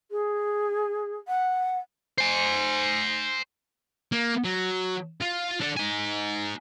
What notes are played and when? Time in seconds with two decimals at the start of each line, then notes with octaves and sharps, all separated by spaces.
0.11 G#4
1.28 F#5
2.18 C5 G#5
4.12 A#3
4.45 F#3
5.22 F4
5.61 D4 A4
5.77 D#4 G#5